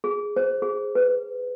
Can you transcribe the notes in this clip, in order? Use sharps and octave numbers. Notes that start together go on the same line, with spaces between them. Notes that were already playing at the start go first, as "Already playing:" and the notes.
G#4
C5
G#4
B4